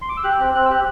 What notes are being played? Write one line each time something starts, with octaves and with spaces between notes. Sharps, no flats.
C6
D6
E6
G4 F#6
C4 F#6
C4 F#6
E6
G4 F#6